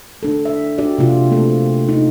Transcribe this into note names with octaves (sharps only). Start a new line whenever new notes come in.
D4 A4
E5
D4 F#4 G4 D5
C3 A#3 F4 G4
A3 A#3 C4 A4
D#4